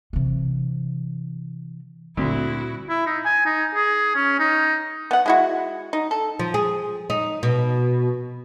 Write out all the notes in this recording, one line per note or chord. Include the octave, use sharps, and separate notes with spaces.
C3 E3
D2 A#2 G3 C4 E4 F#4
E4
D#4
G#5
D#4
G#4
C#4
D#4
B3 F#5
G#3 E4 F#4
D#4
A4
F3
G#4
D#4
B2